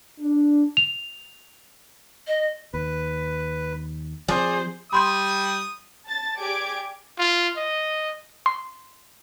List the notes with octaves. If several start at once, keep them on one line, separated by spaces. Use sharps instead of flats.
D4
F7
D#5
D#2 B4
F3 C4 G#4 C5 D5
G3 B5 C6 D#6 G6
A5 A6
G4 G#4 D5 D6 G#6 D7
F4
D#5
C6